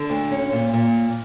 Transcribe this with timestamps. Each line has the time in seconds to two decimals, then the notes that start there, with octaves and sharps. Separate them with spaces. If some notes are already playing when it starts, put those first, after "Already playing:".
Already playing: D3
0.10 D2
0.31 C#4
0.52 A#2
0.73 A#2